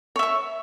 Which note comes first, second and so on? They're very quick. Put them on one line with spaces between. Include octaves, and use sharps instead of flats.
C#5 E5 C#6